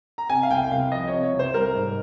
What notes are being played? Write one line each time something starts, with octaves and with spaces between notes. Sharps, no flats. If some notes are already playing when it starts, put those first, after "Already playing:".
A#5
C3 G#5
F5
C2 G5
C2 F5
F3 D#5
C#5
C3
C#5
C2
C5
G3 A#4
G#2